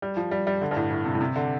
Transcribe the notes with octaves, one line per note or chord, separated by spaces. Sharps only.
G3
F3
G3
G3
D3
G2
A2
A2
C3
A2
C3
D3